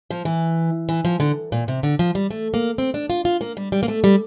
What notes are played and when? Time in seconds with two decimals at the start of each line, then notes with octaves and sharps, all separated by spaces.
0.11 F3
0.25 E3
0.89 E3
1.05 F3
1.20 D3
1.52 A#2
1.68 C3
1.83 D3
1.99 F3
2.15 G3
2.31 A3
2.54 A#3
2.78 C4
2.94 D4
3.10 F4
3.25 F4
3.41 A#3
3.57 G3
3.72 G3
3.83 A#3
3.88 A3
4.04 G3